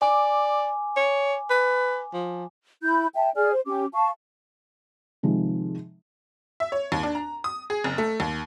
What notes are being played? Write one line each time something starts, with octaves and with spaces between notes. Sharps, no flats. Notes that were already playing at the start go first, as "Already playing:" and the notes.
D5 G#5 D6
C#5
B4
F3
E4 B5 G6
E5 G5 A5
G#4 D5 G#5 F6
C5
C#4 G4 D6
F5 A5 C#6
C3 D#3 F3 G#3
E5
C#5
D#2
D4
A#5
D#6
G#4
F#1
A3
D#2